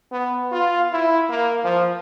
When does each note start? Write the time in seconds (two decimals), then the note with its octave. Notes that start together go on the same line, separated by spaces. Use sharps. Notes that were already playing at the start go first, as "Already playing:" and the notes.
0.12 B3
0.52 F4
0.92 E4
1.29 A#3
1.64 F3